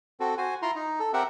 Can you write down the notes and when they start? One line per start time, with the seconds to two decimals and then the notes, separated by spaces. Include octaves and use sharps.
0.20 C4 F#4 A4
0.38 F#4 C5 G#5
0.62 E4 F4 A#5 C6
0.75 D#4
1.00 A4
1.13 C4 G4 A#4 E5 F#5